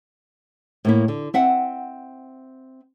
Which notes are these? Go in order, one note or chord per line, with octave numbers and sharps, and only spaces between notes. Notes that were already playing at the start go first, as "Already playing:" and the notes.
A2 A#3 E4
D3
C4 E5 F#5